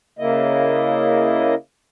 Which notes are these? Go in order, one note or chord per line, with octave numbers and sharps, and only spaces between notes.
C#3 A#3 E4 D#5